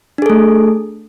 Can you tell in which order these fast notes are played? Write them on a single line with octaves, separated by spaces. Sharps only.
D4 G#4 A4 A3